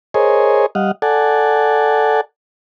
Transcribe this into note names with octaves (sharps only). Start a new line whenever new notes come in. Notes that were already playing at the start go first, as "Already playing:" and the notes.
G#4 A#4 C5 C#5 D#5 G#5
G3 D#5 F5 F#5
A4 D5 F#5 G#5 A5